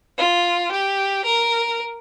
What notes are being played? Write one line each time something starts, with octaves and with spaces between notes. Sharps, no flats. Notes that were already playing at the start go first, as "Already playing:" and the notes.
F4
G4
A#4